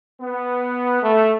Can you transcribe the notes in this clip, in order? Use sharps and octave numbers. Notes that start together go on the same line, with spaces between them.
B3
A3